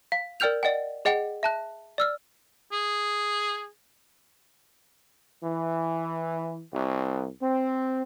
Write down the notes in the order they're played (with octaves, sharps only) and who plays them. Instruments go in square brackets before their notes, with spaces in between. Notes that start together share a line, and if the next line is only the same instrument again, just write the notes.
[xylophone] F5
A#4 D5 G5 F6 G6 F7
D5 D#5 F#5 G5
G#4 D#5 F#5 G5
E5 A5 F#6
D5 E6 F6
[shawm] G#4
[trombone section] E3
C2
C4